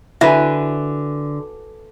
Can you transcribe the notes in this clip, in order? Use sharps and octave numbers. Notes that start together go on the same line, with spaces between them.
D3 E4 F#4 B4 E5 G#5